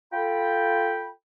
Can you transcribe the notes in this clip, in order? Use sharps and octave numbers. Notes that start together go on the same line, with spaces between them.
F4 A4 G5 B5